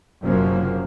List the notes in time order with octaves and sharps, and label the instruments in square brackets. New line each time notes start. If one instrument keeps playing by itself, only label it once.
[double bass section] F#1 F#2 C3 F3 A#3 C#4